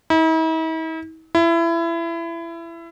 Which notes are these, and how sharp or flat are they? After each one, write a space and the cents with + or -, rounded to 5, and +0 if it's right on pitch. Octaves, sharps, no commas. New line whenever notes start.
E4 -45
E4 +25